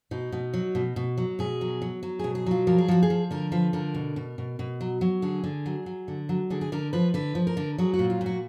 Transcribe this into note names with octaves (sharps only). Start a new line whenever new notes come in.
B2 D#4
B2
F#3
B2
B2
F#3
B2 G#4
F#3
F#3
F#3
B2 G#4
G#4
F#3 F4
F3 A#4
G#4
F3 F#4
G#4
F3
D3 A#4
F3 B4
D3 A#4
B2
B2
B2
B2
F#3
F#3
D3 G#4
D3
F#3
F#3
D3
F#3
D3 G#4
G#4
D3 A#4
F3 B4
D3 B4
F3
A#4
D3
F#3 G#4
F#4
A#2
F4
A#2
F#4